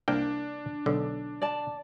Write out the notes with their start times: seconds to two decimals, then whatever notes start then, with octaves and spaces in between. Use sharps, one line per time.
0.08 C2 A#3 D4 G5
0.86 B1 D3
1.42 D5 A5